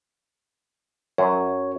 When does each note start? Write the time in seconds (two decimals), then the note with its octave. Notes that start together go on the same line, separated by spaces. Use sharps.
1.18 F#2 C#5